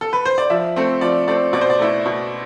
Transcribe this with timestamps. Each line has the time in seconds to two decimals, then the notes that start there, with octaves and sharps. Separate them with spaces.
0.01 A4
0.13 B4
0.25 C5
0.38 D5
0.50 F3 E5
0.76 A3 C4
1.01 F3 D5
1.28 A3 C4 D5
1.53 B2 D5
1.61 C5
1.70 D5
1.79 A3 E4
2.06 B2